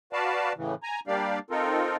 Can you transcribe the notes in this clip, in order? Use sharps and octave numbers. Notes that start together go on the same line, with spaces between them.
F#4 B4 D5 F5 A5
A2 C#3 E3
G#5 A#5
G3 A#3 D4 G4 D5 F5
C4 D#4 F4 A4 A#4